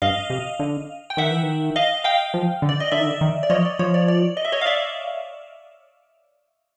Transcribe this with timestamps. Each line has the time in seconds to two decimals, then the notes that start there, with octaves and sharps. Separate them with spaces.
0.02 G2 D#5 F5
0.30 C3
0.59 D3
1.10 G5
1.17 D#3 E5 F#5
1.31 E3
1.43 D#3
1.76 D#5 F5
2.04 F5 G5
2.34 F3
2.62 D3
2.69 D5
2.80 D#5
2.91 D3 D5 E5
3.00 D#3
3.06 D3
3.21 D#3
3.43 D5
3.50 F3 C#5 D#5
3.65 D5
3.79 F3 C#5
3.94 D5
4.08 D5
4.37 D#5
4.45 E5
4.52 C#5 D#5
4.61 F5
4.66 D5 E5